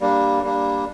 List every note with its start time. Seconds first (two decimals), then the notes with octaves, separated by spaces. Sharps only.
0.01 G3 A#3 D4
0.43 G3 A#3 D4